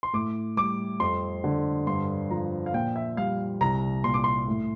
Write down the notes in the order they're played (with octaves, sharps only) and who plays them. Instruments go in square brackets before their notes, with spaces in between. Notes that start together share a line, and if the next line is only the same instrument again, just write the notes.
[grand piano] C6
[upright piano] A2 [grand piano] D6
[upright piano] G3 [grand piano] D6
[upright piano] F2 [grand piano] C6
[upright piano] D3
[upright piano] G2 [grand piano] C6
[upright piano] F3 [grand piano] A#5
[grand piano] F5
[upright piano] A#2 [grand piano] G5
[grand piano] E5
[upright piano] G3 [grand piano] F5
[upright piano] C2 [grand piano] A#5
[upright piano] A#2 [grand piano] C6
[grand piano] D6
C6
[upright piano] A2